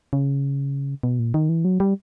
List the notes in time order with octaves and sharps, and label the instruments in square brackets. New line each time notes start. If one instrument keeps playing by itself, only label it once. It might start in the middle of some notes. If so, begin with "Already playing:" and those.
[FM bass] C#3
B2
A#2
D#3
E3
F#3
G3